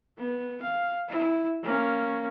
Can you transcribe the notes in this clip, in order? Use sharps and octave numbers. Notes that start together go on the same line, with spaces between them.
B3
F5
E4
A#3 C#4